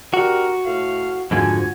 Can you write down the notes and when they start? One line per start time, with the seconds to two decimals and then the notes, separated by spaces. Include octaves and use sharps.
0.14 D4 F#4 G4 A#4
0.65 A2 F5
1.31 F2 G#2 D3 F4 F#4 G#5